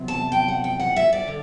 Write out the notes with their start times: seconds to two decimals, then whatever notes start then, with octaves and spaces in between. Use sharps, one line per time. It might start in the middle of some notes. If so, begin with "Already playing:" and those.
Already playing: E2 C3 F#3
0.08 A5
0.32 G5
0.48 F#5
0.64 G5
0.79 F#5
0.96 E5
1.13 D5
1.28 D3